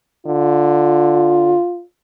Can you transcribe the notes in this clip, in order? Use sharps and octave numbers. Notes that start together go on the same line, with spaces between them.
D3 F4